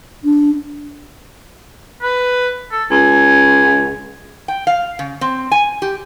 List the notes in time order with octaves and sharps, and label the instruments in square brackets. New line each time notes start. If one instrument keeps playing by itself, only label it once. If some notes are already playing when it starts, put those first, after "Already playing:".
[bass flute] D4
[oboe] B4
A4
[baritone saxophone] C#2 [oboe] G#5
[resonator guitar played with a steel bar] G5
F5
C#3
C4
G#5
G4